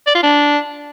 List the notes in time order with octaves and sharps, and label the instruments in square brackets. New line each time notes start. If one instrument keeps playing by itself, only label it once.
[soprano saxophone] D5
F4
D4